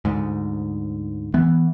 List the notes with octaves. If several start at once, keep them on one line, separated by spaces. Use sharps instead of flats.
D2 G#2
E3 B3